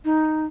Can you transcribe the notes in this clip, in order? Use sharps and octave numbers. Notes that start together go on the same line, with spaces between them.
D#4